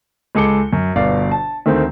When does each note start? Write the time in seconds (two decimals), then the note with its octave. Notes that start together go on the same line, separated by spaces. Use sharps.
0.35 C#2 G#3 A4 D6 C#7 G7
0.73 F#2
0.96 G1 B2 D5 F5
1.32 A5
1.66 D2 D#3 A3 C4